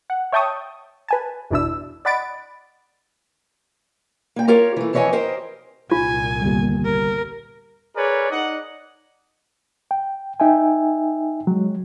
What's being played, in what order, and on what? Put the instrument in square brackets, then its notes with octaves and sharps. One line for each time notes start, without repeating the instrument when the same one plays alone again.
[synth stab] F#5
C#5 E5 G5 A5 C#6 D#6
B4 G#5 A5
G#1 E2 B2 D4 E4 E6
D5 D#5 F#5 B5 A6 D7
[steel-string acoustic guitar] A#3 G5
F4 G4 A#4 C#5
E3 A3
F2 E3 B4 C#5 D#5 G#5
G4 A#4 C5 D#5 G5
[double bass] C2 A#2 [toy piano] F4 [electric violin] G#5
[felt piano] G1 D#2
[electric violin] A#4
[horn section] G#4 A#4 B4 C#5 D5
D#4 D5 D#5 F#5
[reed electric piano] G5
D#4 E5 G5 G#5
F#3 G#3